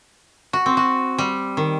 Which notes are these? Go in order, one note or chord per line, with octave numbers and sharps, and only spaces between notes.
F#4
C4
F#4
G3
D#3